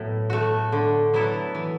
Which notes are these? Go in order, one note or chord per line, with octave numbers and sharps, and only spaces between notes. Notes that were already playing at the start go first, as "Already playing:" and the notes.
Already playing: A2 F#3 B3 E4
A3 F#4
D3
F#3 B3 E4 A4
E3